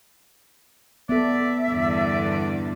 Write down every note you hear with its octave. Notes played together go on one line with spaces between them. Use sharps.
B3 A4 D5 E5
E2 G2 D3 D5